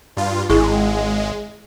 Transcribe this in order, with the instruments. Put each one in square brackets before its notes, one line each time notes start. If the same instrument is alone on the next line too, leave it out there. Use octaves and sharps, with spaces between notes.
[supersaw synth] G2 F4
[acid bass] G#1 [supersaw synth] G#3 [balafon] E4 G#4